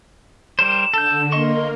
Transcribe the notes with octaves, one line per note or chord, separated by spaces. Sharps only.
G3 A#4 C5 E7
D3 A4 G6
A#3 A#4 D#5 C6 C#6